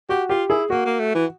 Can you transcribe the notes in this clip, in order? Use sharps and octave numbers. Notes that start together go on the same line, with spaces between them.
F#4 G4
F4 G4
E4 G#4
A#3 F#4
A#3
A3
E3